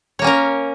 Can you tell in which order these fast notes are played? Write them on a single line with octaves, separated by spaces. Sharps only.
C#5 A#3 C#4 A#4